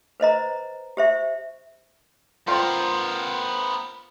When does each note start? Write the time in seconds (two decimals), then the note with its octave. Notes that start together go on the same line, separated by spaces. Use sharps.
0.20 B4 C5 D#5 A#5
0.97 G4 C5 E5
2.47 B3 F4 A#4 C5 G5